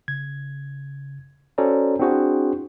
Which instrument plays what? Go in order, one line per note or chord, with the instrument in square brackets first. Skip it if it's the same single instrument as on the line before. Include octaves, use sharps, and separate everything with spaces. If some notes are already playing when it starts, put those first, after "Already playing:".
[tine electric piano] C#3 G#6
C#4 F#4 A4 C5 D5 A#5
C4 D4 E4 F#4 G#4 C5